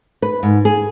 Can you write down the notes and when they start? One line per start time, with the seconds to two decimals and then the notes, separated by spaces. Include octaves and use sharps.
0.22 B4
0.43 G#2
0.65 G#4